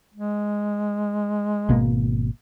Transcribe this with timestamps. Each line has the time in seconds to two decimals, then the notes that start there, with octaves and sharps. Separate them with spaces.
0.14 G#3
1.69 G#1 B2 A#3